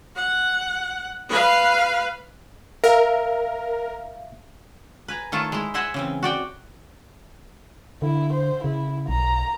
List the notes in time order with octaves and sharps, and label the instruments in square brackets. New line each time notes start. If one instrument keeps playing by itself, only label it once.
[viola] F#5
B4 F5
[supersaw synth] A#4 [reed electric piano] E5 F5
[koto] B4 G#5 A#5
D#3 A3 F4 C#5 A5
G#3 E4
C5 D#5 E5 F#5 G#5
C#3 E3 C4
F#4 D5 G5
[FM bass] D3 [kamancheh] E4
[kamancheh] C5
[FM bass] C#3 [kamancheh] E4
[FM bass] B1 [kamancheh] A#5